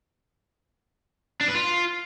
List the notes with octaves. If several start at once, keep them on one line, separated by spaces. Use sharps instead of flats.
D4
B4
F4